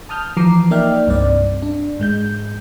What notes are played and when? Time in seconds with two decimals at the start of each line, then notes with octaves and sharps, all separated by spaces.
0.09 A5 D#6 F6 G6
0.37 E3 F3 A#5 D6 C7
0.71 A#3 D#4 D5 E5 G5 F6
1.07 C2 G2 C4 D5
1.62 D4
1.99 G#2 G#3 G6